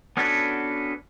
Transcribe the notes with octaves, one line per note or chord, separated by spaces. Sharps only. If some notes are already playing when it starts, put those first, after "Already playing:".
B3 C#4 D4 F#4 A4 B4